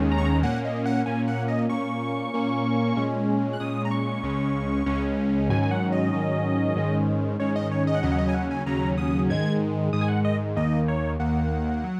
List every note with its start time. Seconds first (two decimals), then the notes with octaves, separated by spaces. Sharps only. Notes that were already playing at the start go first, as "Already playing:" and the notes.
Already playing: D#2 D#3 G#3 C#4
0.12 A#5
0.18 C#6
0.25 A#5
0.43 A#2 A#3 C#4 F#5
0.65 D#5
0.86 F#5
1.06 A#2 A#3 C#4 G#5
1.28 F#5
1.48 D#5
1.69 A#2 A#3 C#4 C#6
2.33 A#2 A#3 C#4
2.97 A#2 G#3 C#4
3.53 F#6
3.60 A#2 G#3 C#4 D#6
3.85 A#5
3.91 C#6
4.23 C#2 C#3 G#3 C#4
4.86 C#2 C#3 G#3 C#4
5.50 G#2 D#3 F#3 C#4 G#5
5.62 G#5
5.71 F#5
5.92 D#5
6.13 G#2 D#3 F#3 C#4
6.76 G#2 D#3 G#3 C#4
7.40 G#2 D#3 G#3 C#4 C#5
7.56 D#5
7.72 C#5
7.87 D#5
7.95 F#5
8.03 D#2 C#3 F#3 C#4 D#5
8.12 F#5
8.18 D#5
8.29 G#5
8.34 F#5
8.51 G#5
8.66 D#2 C#3 F#3 C#4 A#5
8.98 D#6
9.29 G#2 D#3 G#3 G#6
9.93 G#2 D#3 G#3 D#6
10.01 G#5
10.08 F#5
10.25 D#5
10.56 D#2 D#3 A#3 D#5
10.88 C#5
11.19 D#2 D#3 A#3 F#5
11.84 F#3